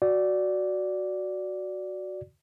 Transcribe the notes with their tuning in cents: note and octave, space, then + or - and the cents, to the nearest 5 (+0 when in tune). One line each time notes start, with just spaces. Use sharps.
F#4 +0 D5 -5